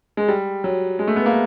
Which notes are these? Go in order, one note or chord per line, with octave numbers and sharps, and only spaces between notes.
G#3
G3
F#3
G#3
A3
B3
A#3